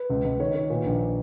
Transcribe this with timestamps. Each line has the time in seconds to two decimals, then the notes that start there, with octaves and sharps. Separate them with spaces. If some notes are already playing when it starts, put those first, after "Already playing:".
Already playing: B4
0.10 C#2
0.24 C#2
0.40 D#3 C#5
0.55 D#3
0.70 A#2 B4
0.85 A#1